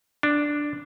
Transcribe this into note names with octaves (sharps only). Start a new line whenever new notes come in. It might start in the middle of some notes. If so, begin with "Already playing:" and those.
D4